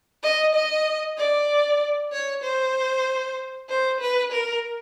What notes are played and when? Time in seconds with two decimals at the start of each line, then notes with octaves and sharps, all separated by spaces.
0.23 D#5
0.55 D#5
1.18 D5
2.12 C#5
2.44 C5
3.69 C5
4.00 B4
4.32 A#4